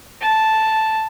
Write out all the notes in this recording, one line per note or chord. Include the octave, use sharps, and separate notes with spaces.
A5